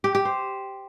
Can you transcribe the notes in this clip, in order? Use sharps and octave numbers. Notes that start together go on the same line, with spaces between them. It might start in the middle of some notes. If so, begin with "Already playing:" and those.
G4
G4
C5